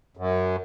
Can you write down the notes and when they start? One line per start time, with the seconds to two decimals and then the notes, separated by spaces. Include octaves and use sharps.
0.17 F#2